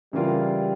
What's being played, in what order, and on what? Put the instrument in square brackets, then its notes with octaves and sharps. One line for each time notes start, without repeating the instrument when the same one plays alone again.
[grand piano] C#3 E3 A#3 F4 [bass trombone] G3